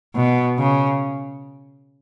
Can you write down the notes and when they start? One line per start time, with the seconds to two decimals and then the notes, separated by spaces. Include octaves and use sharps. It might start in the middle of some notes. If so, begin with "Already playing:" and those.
0.16 B2
0.58 C#3